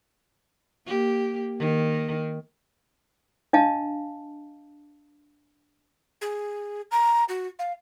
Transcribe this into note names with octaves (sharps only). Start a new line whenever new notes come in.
A#3 G4
D#3 A#3
D4 D#5 F5 A5
G#4
A#5
F#4
F5